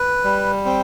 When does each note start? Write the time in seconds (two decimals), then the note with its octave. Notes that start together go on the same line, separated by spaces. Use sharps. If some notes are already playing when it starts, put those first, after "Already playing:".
Already playing: B4
0.24 G3
0.65 C4